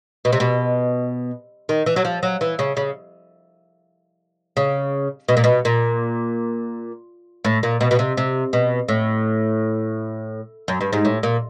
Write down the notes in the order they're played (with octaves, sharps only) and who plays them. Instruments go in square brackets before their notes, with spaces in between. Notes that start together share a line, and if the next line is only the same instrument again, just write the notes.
[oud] B2
C3
B2
D#3
E3
F#3
F3
F#3
E3
C#3
C#3
C#3
B2
A#2
B2
A#2
A2
A#2
B2
B2
C3
C3
B2
A2
F#2
G2
G#2
A2
A#2